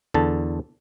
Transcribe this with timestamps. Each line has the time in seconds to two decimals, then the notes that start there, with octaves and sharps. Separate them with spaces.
0.14 E2 D3 A4 A5